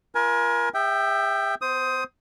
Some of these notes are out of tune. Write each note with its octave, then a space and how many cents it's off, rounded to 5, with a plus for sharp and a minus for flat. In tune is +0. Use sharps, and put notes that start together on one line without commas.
F4 -30 A#4 +35 G#5 +15
G#4 -45 E5 +0 G5 +0
B3 +40 C5 +0 D#6 +20